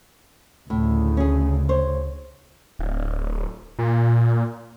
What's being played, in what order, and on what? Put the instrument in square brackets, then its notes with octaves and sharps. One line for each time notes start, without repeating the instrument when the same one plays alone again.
[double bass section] D2 C#3 [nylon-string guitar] A2
[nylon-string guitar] C#4 G#4
C5 C#5
[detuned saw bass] D1
A#2